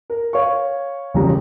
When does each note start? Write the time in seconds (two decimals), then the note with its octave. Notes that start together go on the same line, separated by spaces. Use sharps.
0.10 A#4
0.33 C#5 F5 C#6
1.14 E1 A1 C#3 F3 G3 A#5